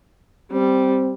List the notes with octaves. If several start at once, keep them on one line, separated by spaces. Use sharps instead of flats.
G3 C4